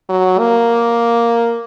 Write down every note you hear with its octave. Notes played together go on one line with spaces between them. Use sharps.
F#3
A#3